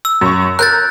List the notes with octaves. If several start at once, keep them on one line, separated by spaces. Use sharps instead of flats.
E6
F#2 C#6
A#4 F#6 G6 A6